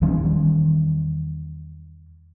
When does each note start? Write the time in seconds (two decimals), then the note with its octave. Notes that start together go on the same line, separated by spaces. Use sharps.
0.02 E2 D#3 G3 C#4